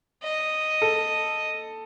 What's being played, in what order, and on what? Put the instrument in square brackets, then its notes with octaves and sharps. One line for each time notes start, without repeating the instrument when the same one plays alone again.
[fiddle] D#5
[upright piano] A4